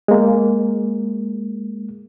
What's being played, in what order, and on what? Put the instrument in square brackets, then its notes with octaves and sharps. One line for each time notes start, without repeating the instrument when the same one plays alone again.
[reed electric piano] G#3 A#3